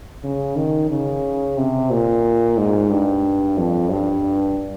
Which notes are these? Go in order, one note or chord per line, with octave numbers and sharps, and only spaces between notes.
C#3
D#3
C#3
C3
A#2
G#2
G2
F2
G2